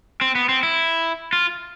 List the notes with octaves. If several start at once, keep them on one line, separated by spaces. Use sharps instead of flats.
C4
B3
C4
E4
F4